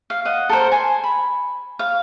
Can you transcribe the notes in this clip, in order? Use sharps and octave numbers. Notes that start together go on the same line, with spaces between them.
F5
D#5 F#5
A4 A#4 C5
C5 G#5
B5
F5